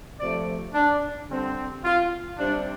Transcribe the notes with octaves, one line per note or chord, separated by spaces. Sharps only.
C3 F3 A3 D5
D4
D3 G3 C4
F4
C3 G3 C4 D4